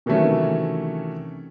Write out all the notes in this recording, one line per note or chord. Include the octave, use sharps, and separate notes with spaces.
C3 D#3 E3 F#3 A3 C#4